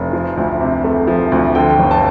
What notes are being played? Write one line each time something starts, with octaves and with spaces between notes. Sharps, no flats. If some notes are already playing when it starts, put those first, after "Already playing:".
Already playing: F1
F3
D2
C3
A3
F3
D2
D3 G5
G1
A5